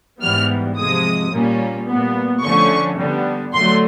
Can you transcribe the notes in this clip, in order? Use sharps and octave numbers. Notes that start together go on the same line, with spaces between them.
G#2 E3 G3 B3 F6
C3 F3 G#3 D#6
A#2 G3 A#3 C#4
A#2 G3 B3
D3 F3 A3 C#4 C#6
D3 G3 B3
D3 F#3 A3 C6